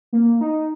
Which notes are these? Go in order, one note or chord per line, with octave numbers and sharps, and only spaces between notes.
A#3
D#4